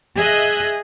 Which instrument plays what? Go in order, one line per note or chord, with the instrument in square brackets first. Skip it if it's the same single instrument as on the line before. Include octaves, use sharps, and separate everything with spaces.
[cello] G#4 [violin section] D#5 E5 F#6